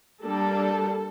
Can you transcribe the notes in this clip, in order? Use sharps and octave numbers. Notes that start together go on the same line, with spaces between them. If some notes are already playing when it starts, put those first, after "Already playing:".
G3 A#3 D4 A4